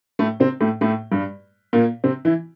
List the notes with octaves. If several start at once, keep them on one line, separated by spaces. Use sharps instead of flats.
A2 A3
C3 C4
A2 A3
A2 A3
G2 G3
A#2 A#3
C3 C4
E3 E4